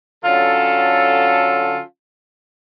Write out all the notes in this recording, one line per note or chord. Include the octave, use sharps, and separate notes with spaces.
D3 F#3 C#4 F4 A4